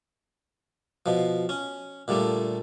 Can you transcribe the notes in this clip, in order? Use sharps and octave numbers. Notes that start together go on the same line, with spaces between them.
B2 F3
C#4
A#2 D3 G3 A3